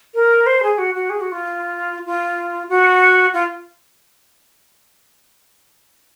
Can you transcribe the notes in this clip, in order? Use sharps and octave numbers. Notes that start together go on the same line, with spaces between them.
A#4
C5
G#4
F#4
F#4
G#4
F#4
F4
F4
F#4
F4